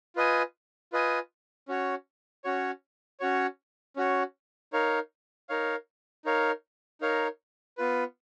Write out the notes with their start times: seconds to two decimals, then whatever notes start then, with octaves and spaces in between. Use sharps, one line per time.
0.16 F4 B4 D#5 G#5
0.93 F4 B4 D#5 G#5
1.68 C#4 F#4 C#5
2.44 C#4 F#4 C#5
3.20 C#4 F#4 C#5
3.96 C#4 F#4 C#5
4.73 D#4 A#4 C#5 F5
5.49 D#4 A#4 C#5 F5
6.25 D#4 A#4 C#5 F5
7.01 D#4 A#4 C#5 F5
7.77 B3 F4 B4